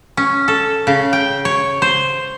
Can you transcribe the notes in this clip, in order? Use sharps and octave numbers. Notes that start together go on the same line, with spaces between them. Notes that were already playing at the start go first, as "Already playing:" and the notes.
C#4
A4
C#3
G5
C#5
C5